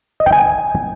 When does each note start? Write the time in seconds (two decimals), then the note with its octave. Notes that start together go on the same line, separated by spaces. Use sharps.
0.20 D#5
0.26 G5
0.32 G#5